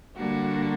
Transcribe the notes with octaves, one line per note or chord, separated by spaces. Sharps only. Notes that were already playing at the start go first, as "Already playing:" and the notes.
D3 G3 A#3 D4 F#4